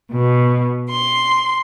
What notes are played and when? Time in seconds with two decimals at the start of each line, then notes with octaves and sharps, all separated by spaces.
0.11 B2
0.90 C6